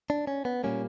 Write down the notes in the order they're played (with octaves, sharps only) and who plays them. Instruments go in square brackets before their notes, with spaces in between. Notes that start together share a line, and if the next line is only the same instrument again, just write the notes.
[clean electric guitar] D4
C#4
B3
A#2 G3 A#3 C#4